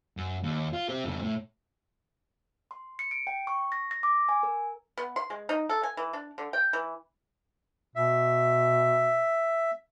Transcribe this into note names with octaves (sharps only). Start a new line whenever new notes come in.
F#2
D#2
F4
C4 G4
F2 C#3
A2
C6
C#7
D7
G5
C#6
A#6
A#6
D6
G#5
A#4
B3
C6
G#3
D#4
A4
G#5
E3
D4
D3
G5
E3
B2 E5